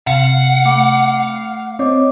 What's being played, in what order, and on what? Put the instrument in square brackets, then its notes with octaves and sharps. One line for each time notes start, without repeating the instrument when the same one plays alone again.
[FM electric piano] C3 [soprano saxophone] F5 [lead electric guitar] F#5
[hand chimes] A3 D6 C#7
[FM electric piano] C4 [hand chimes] C#5 D#5 D6